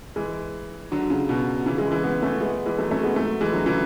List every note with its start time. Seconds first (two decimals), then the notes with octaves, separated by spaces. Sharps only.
0.16 E3 G#3
0.91 D3 F#3
1.10 C#3
1.29 B2
1.66 C#3 E3
1.78 E3 G#3
1.91 E3 G#3
2.03 G#3 B3
2.22 A3 C#4
2.41 G#3 B3
2.66 E3 G#3
2.78 F#3 A3
2.91 A3 C#4
3.03 G#3 B3
3.16 F#3 A3
3.41 E3 G#3
3.53 D3 F#3
3.66 C#3 E3